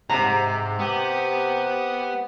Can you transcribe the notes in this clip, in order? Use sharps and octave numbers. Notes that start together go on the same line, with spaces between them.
B1 G#2 C3 A#5
B3 G4 D#6